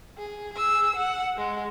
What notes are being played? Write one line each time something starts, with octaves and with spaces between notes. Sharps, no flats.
G#4
G#4 E6
F#5
G#3